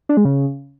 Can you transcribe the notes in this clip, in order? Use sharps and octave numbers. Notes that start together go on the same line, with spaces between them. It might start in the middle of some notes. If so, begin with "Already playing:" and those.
D4
G#3
C#3